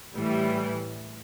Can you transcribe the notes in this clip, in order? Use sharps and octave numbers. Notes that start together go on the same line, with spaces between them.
A2 E3 G3